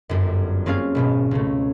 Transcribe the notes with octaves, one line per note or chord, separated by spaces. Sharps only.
G1 F#2
A#3 C4 C#4 F4 G#4 F5
G#1 B2 B3
C#2 A3